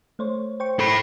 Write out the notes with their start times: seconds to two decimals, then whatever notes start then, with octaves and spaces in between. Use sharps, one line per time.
0.19 A3 C5 C#5
0.60 C5 G5 C#6
0.79 A4 B5